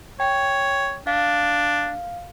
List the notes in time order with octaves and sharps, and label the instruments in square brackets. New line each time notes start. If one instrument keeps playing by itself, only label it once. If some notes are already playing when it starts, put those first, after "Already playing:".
[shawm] C#5 [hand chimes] G5
[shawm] D4 [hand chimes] F5